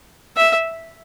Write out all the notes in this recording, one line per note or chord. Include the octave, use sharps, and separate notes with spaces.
E5